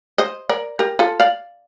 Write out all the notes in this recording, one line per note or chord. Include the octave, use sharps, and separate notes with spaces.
C5 D#5
A#4 D5
G4 A#4
F4 A4
D5 F5